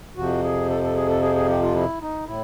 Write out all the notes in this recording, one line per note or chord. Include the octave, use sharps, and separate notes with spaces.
F2 C3 F3 F#4
G#4
A4
A4
G#4
A4
G#4
G#4
G4
F4
E4
D#4
A2 E4